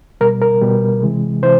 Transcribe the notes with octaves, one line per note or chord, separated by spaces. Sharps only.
B2 G3 A#4
A#4
B2 G3
C3 E3 G#3
C3 E3 C5